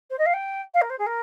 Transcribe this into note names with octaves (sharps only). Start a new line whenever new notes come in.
C5
D#5
F5
G5
F5
A#4
C5
G#4
A#4